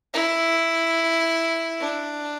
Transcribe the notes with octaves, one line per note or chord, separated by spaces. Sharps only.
E4
D4